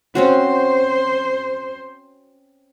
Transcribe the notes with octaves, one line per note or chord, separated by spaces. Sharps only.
C4 C#4 F#4 C5